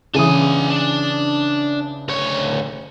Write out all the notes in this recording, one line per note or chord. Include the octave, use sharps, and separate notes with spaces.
C#3 E3 D4 G#5 D#6
D4
D2 C#5